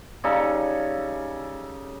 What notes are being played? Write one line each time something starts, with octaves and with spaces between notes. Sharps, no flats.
C#3 G3 D#4 A4